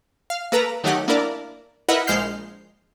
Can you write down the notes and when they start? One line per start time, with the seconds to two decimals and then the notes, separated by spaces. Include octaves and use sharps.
0.30 F5
0.52 A#3 A4 B4 A#5
0.84 D#3 F#3 A3 D#4 G4 F#5
1.08 A#3 D4 E4 A#4 D5
1.88 E4 A#4 B4 D#5 E5 F#5
2.07 A#1 G#3 C5 F6 G6 C7